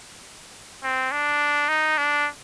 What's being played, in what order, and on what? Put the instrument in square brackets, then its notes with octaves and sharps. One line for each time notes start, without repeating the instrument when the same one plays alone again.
[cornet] C4
D4
D#4
D4